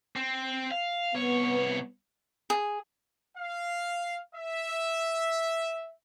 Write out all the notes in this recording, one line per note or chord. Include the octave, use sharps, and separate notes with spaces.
C4
F5
C2 B3 C#5
G#4
F5
E5